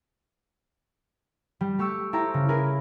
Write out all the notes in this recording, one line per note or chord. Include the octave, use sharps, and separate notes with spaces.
G3
A3 G4 C#6 E6
E4 G4 A4 C5 A#5
C#3
E4 G#4 A#4 B4